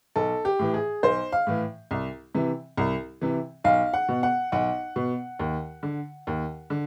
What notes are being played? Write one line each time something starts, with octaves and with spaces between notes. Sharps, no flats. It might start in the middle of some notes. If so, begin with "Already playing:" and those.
B1 A4
G4
A2 E3
G#4
B1 C5
F5
A2 E3
C2
C3 E3
C2
C3 E3
B1 F5
F#5
B2
F#5
B1 F#5
B2
D#2
D3
D#2
D3